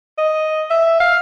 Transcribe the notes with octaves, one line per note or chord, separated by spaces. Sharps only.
D#5
E5
F5